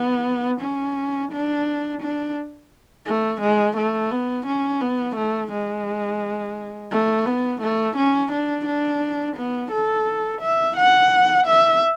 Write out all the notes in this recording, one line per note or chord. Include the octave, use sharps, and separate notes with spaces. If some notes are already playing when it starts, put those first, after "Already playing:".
Already playing: B3
C#4
D4
D4
A3
G#3
A3
B3
C#4
B3
A3
G#3
A3
B3
A3
C#4
D4
D4
B3
A4
E5
F#5
E5